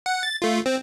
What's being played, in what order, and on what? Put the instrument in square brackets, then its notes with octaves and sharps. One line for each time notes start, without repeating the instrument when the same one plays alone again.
[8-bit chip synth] F#5
A6
A3 F4
C4